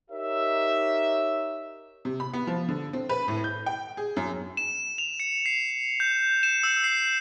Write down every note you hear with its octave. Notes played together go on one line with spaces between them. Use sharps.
D#4 G4 A#4 C#5 E5
C3
B5
B3
F3
D3
C4
B4
A2
G6
G5
G#4
F#2
E7
F7
C#7
C7
G6
E7
E6
C7